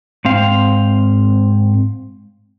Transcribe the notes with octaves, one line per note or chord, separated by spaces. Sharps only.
G#2 C4 F5